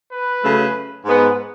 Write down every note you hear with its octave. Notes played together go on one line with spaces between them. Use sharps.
B4
C#3 F#3 A3
G#2 G#3 B3